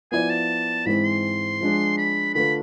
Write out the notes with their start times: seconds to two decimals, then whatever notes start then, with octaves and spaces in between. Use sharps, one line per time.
0.12 F3 B3 E4 B4 D5 G#5
0.30 A5
0.86 G#2 E3 G#3 C4 B5
1.05 C6
1.60 F3 G#3 D4 G#4
1.97 B5
2.35 D3 A3 D4 F4 B4 B5